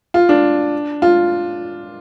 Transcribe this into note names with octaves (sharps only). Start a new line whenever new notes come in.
F4
D4
F4